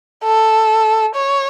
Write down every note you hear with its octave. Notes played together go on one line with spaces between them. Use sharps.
A4
C#5